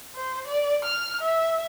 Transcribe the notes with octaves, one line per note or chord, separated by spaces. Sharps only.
C5
D5
F6
E5